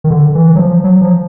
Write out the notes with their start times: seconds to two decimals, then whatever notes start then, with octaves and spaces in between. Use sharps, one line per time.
0.04 D#3
0.10 D3
0.35 E3
0.55 F#3
0.59 F3
0.84 F#3
1.01 F3